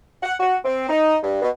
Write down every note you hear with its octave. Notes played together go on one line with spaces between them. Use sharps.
F#5
F#4
C4
D#4
G2
B2